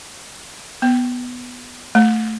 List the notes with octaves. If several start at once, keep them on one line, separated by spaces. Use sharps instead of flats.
B3
A3